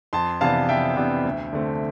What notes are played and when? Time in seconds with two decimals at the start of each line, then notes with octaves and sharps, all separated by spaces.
0.13 F2 A5 C6
0.41 C3 E3 B3 D4 F5 A5
0.69 F2 E5 G5
0.97 C3 E3 B3 D4
1.25 D2
1.53 D3 A3 C4